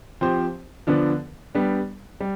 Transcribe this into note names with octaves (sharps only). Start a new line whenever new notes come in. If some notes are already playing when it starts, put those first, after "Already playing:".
F3 C4 G4 C5
D3 F3 B3 D4
G3 B3 D4
G3